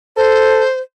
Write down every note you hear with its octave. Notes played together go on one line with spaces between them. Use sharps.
A4 C5